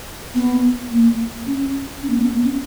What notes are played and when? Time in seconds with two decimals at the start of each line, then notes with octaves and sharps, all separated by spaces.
0.35 B3
0.91 A#3
1.47 C#4
2.03 C#4
2.10 A#3
2.17 B3
2.26 A#3
2.31 B3
2.44 C#4